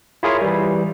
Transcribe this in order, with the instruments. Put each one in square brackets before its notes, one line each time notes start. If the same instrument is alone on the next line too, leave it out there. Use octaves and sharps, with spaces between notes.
[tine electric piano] E4 F4 G#4 A#4 C#5
E3 G3